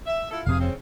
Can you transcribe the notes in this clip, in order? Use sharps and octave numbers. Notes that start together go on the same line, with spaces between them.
E5
E4 F4 A4
F1 C3 G#4 F5
C#3 C4